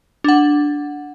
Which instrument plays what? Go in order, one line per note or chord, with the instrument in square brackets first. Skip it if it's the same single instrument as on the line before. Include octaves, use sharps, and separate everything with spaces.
[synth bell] D4 F#5